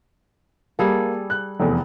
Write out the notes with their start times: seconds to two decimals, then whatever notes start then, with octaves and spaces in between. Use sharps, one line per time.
0.79 G3 A#3 G#4 A4
1.30 F#6
1.60 F1 E2